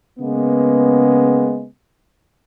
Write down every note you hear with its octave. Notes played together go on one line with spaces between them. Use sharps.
C#3 G#3 A#3 B3